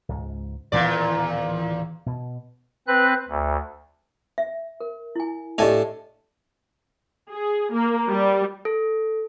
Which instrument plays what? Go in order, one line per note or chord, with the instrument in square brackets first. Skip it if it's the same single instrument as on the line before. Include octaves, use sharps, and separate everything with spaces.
[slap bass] C#2 G#2
[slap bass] D1 D#3 C#4 [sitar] E2 A#2 D5
[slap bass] B2
[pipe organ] C4 B4 F#6
D2
[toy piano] E5
A#4
E4 G#5
[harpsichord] A2 D4 G#5 [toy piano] G4 D#5 E5
[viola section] G#4
A#3
G3
[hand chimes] A4